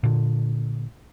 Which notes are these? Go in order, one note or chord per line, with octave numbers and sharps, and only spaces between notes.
A#2 D3